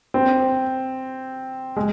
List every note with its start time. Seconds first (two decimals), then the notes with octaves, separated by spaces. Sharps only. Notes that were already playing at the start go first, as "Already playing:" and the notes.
0.14 C4
1.76 G#3